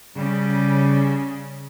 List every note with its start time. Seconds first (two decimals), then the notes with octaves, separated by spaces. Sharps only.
0.16 C#3 G3